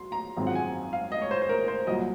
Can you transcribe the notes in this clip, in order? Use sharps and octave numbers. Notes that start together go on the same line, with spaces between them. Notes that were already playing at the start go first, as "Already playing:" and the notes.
Already playing: F#3 C6
A#5
G#1 F#2 F3 G#3 C4
F#5
G#5
F5
D#5
C#5
C5
C5
A#4
C5
C2 A#2 F#3 D#5